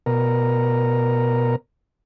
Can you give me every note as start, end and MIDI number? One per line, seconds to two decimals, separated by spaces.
0.06 1.56 47
0.06 1.56 70